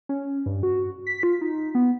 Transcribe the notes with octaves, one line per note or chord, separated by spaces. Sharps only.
C#4
G2
F#4
B6
F4
D#4
B3